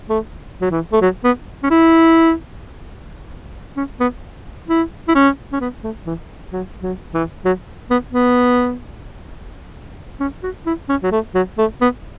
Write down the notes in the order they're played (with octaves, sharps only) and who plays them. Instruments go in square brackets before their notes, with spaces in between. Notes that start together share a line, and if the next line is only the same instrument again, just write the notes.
[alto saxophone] A3
F#3
E3
A3
F#3
B3
C#4
E4
C#4
B3
E4
E4
C#4
C#4
B3
A3
E3
F#3
F#3
E3
F#3
B3
B3
C#4
F#4
E4
C#4
F#3
A3
F#3
A3
B3